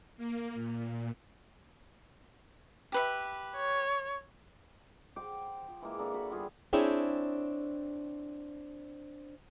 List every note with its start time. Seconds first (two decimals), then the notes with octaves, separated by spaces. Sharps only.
0.17 A#3
0.55 A#2
2.92 G4 B4 E5
3.57 C#5
5.16 C5 F#5 G5 D6
5.68 F3
5.82 E3 G#3 A#3 E4
5.99 A#3 D4 A4
6.14 F#4 B5
6.30 G3 B3 F4 G#4
6.73 C4 D4 E4 G#4 C#5 G5